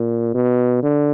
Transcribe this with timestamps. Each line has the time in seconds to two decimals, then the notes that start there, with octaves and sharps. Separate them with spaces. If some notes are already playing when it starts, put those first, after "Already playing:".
Already playing: A#2
0.35 B2
0.83 D3